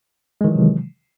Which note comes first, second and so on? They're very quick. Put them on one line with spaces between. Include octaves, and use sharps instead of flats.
G#3 D#3 E3 F#3 C3